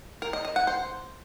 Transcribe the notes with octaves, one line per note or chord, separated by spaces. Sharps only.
A#4
D#5
D#5
F#5
C5